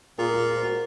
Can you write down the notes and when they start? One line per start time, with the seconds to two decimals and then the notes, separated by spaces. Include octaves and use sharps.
0.18 A#2 F4 G#4
0.34 F4 G#4
0.50 A#4
0.56 C5
0.63 F#4 A#4